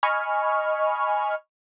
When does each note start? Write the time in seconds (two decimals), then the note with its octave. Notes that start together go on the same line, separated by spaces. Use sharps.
0.03 D#5 G#5 B5 C#6 F6